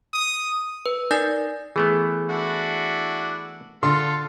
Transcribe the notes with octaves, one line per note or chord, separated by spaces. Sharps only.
D#6
B4
D#4 A#4 D5 G#5 G6 A#6
E3 A3 B3 G#4
D4 E4 F#4
D3 F4 A4 C6